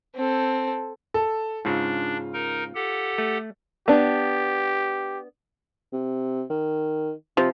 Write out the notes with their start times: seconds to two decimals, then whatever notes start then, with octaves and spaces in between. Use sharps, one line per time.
0.16 C4 A4
1.14 A4
1.65 G#2 C#3 D4 F4
2.33 D#4 A#4
2.75 G4 A4 F#5
3.18 A3
3.88 B3 D4 G4
5.93 C3
6.50 D#3
7.37 C3 F3